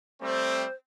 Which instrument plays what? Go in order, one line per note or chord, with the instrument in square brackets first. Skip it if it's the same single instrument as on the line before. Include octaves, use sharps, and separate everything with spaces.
[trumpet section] G3 A3 C4 [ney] C5